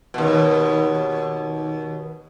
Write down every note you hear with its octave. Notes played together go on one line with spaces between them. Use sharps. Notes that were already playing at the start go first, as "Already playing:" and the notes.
D#2 B2